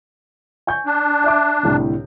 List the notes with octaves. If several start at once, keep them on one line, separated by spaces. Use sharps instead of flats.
G#5 C#6 G6
D4
D5 E5 D6
C2 A2 D3